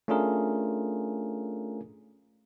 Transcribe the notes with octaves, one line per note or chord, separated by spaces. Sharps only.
A3 C#4 D4 F4 G#4 A#4